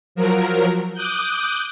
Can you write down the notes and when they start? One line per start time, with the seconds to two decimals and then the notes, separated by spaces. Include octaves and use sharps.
0.15 F3 F#3 A#4
0.93 D6 D#6 F#6 G6